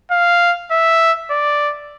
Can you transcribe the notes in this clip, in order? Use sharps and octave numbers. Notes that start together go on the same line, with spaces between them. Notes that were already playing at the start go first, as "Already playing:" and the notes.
F5
E5
D5